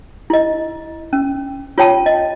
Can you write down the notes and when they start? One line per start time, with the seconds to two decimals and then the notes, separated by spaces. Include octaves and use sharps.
0.30 E4 D#5
1.13 C#4
1.78 F4 C#5 G5 A5
2.06 D#5